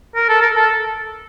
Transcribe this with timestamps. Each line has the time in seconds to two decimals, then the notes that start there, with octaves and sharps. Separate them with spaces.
0.15 A#4
0.29 A4
0.42 A#4
0.56 A4